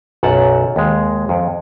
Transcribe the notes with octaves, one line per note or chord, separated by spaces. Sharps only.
B1 F#2 F#5 A5
D#2 G#3
F2